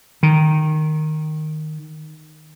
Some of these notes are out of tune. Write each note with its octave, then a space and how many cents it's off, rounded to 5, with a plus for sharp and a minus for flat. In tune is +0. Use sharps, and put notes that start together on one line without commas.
D#3 -10